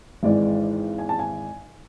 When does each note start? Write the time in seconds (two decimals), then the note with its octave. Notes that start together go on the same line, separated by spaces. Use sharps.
0.23 G#1 G#2 E3 G#3 D5
0.98 G#5
1.09 A5
1.19 G#5